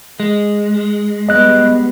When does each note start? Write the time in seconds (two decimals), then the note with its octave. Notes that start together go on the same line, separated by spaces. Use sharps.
0.20 G#3
1.29 G3 B3 D#5 F#6